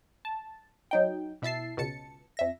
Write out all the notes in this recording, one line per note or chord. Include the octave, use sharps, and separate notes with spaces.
A5
F#3 D#4 G5
B2 E4 E5 A5 C7
C#2 B2 A5 C#7
F2 E5 A#6